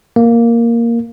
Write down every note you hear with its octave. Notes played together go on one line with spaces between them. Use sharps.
A#3